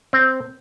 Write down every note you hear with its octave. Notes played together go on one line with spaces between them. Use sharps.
C4